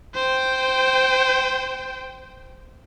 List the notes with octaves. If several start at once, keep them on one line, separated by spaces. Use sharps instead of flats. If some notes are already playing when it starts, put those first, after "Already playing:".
C5 G5